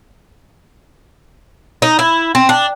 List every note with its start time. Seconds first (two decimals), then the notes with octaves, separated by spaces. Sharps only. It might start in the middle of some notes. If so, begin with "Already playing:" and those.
1.82 D#4
1.99 E4
2.35 C4
2.49 D4